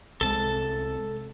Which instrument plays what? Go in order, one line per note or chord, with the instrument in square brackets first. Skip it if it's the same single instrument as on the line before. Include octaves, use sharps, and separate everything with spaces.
[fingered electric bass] C2 C3 G#3 [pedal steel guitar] A4 A5